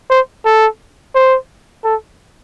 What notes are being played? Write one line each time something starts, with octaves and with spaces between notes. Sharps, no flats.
C5
A4
C5
A4